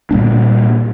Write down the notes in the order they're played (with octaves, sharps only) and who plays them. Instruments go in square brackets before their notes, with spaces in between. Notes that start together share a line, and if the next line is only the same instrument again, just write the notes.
[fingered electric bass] A#2 G3 A#3 D4